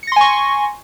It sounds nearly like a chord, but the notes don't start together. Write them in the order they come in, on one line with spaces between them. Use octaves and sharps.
C#7 A#6 C6 G#5 C#6